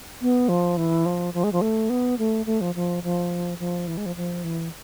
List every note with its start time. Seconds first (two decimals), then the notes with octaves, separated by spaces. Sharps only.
0.22 B3
0.49 F3
0.77 E3
1.06 F3
1.34 F3
1.44 G#3
1.52 F3
1.61 A3
1.90 B3
2.19 A3
2.46 A3
2.61 F3
2.75 F3
3.03 F3
3.59 F3
3.87 E3
3.97 G#3
4.06 F3
4.16 F3
4.44 E3